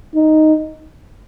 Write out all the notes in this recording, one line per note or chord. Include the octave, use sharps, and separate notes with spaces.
D#4